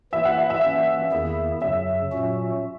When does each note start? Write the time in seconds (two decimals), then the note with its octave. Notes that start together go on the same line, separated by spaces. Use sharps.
0.13 E3 A#3 E4 E5
0.25 F#5
0.38 E5
0.50 E5
0.62 E3 A#3 C#4
1.12 E2 D#3 A#3 E4 G#4
1.62 F#2 C#3 F#3 E5
2.11 A#2 F#3 C#4 F#4